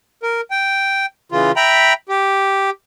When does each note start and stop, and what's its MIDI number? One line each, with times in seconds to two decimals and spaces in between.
0.23 0.41 70
0.51 1.06 79
1.32 1.52 49
1.32 1.52 52
1.32 1.52 65
1.56 1.93 76
1.56 1.93 79
1.56 1.93 82
1.56 1.93 83
2.09 2.70 67